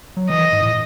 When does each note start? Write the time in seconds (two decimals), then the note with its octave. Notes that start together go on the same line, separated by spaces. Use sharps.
0.17 F#3
0.29 E3 D#5
0.52 G#2
0.62 A2